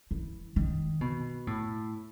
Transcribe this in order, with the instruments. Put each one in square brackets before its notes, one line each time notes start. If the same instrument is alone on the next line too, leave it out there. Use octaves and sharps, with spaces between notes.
[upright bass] E3
D#3
B2
A2